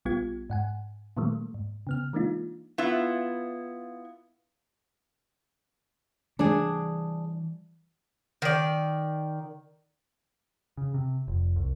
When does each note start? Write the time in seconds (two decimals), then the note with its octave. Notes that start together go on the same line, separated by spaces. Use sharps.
0.05 A#1 G3 B3 F4 G4 G#6
0.50 G#2 F#5 G#5
1.17 A#2 D#3 F#3 G3 A3 A#3
1.54 G#2
1.87 C#3 B3 F6
2.13 E3 G#3 A#3 D4 D#4 F4
2.78 B3 E4 F4
6.39 E3 G3 D4 G#4
8.42 D#3 D5
10.77 C#3
10.94 C3
11.28 F1
11.56 C2